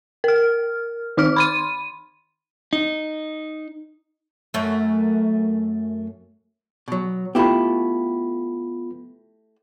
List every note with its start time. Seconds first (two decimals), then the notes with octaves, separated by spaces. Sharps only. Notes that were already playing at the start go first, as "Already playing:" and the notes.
0.24 A#4 F6
1.17 D#3 D#4 D6 F6
1.36 B5 C6 D#7
2.73 D#4
4.54 F#2 A3
6.88 B2 F#3
7.35 A3 B3 E4 F4 G4 B5